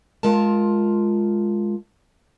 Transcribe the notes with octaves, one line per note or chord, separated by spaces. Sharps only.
G#3 F4 A#4 A5